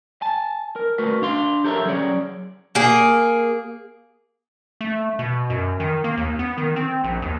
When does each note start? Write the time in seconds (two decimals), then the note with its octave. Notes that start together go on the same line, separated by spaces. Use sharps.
0.22 G#5 A5
0.76 A#4
0.98 A3 F#4 A#4 B4
1.22 D4 F5 C6
1.64 G4 A4 A#4 C#5 E5
1.85 F#3 C#4 G#4 C#5 D5
2.75 A#3 G#4
4.81 A3
5.19 B2
5.50 F#2
5.80 D#3
6.04 A#3
6.17 D#2
6.39 B3
6.58 D#3
6.76 C4
7.04 A#1
7.22 D#2